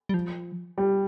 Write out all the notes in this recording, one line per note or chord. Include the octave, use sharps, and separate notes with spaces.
G3
F3
G3